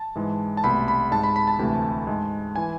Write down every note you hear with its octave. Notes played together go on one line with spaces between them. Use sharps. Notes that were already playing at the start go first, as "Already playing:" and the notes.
Already playing: A5
G#2 E3 G#3
A5
C2 B2 A3 B5
B5
G#2 G#3 A5
B5
B5
A5
D2 C3 E3 A3
G#2 G#3
E3 G#5